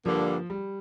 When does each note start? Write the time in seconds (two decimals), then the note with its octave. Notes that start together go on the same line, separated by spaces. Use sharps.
0.05 G2 D3 F3 G3 A#3
0.50 G3